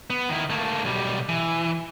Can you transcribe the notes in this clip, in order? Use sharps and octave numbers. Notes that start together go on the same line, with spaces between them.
B3
D#3 E4
A3 A#3
B1 G3
E3